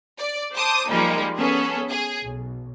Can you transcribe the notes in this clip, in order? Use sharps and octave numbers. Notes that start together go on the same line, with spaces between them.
D5
C5 A5 D6 D#6
F3 G3 G#3 A#3 D#4
B3 C#4 G#4 A4
G#4
B1